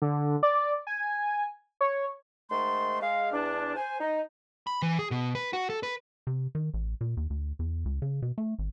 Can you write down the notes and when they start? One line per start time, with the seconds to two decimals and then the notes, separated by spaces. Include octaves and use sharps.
0.02 D3
0.43 D5
0.87 G#5
1.81 C#5
2.50 G#2 D#3 A3 C6
3.01 G#3 F5
3.33 E2 D4
3.77 C5 G#5
4.00 D#4
4.67 B5
4.82 E3
4.99 G#4
5.11 B2
5.35 B4
5.53 F#4
5.70 A4
5.83 B4
6.27 C3
6.55 D#3
6.74 A1
7.01 A#2
7.17 D#2
7.30 D2
7.59 E2
7.85 C#2
8.02 C#3
8.22 B2
8.38 A3
8.59 G#1